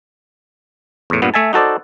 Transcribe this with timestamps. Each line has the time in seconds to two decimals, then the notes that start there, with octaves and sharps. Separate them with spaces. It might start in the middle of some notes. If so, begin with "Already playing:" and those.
1.10 E2 A2
1.22 G2 A#2 B3
1.34 A3 E5 G#5 A5
1.53 D#4 F#4 A4 C5 D5